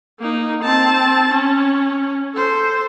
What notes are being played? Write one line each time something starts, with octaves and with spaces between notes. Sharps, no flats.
A#3 D#4
C4 A5
C#4
A4 C5